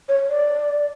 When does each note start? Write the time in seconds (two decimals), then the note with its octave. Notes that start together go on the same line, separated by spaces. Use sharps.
0.09 C#5
0.29 D5